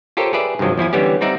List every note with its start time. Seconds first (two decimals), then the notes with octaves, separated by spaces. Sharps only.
0.17 F4 G4 A4 A#4 C5 C#5
0.33 G4 G#4 B4 D5 E5
0.59 G2 C3 D#3 F3 F#3
0.78 E2 F3 E4 G#5
0.93 D3 E3 G3 B3 C#4 G4
1.21 G3 C4 D#4 D5 E5 F#5